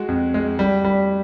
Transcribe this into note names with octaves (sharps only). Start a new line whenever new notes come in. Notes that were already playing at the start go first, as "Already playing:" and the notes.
Already playing: G#3 F#4
F2
G#3
G3
G3